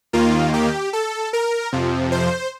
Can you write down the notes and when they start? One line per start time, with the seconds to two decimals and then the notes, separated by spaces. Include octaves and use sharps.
0.13 D#2 D#3 A#3 F4
0.54 G4
0.93 A4
1.33 A#4
1.72 F2 C3 F3
2.12 C5